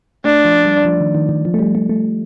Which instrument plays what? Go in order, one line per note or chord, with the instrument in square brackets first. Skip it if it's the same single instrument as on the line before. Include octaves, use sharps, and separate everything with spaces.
[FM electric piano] A3 [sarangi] D4
[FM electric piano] F3
G3
F3
D#3
D#3
D#3
F3
A3
G3
A3
A3